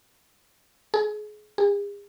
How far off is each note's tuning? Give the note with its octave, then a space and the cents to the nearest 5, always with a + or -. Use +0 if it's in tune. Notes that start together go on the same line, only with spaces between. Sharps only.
G#4 +25
G#4 -45